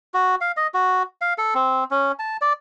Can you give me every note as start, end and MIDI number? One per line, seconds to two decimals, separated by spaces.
0.14 0.35 66
0.41 0.52 77
0.57 0.67 75
0.74 1.03 66
1.21 1.33 77
1.38 1.54 69
1.55 1.84 60
1.91 2.12 61
2.19 2.37 81
2.41 2.53 74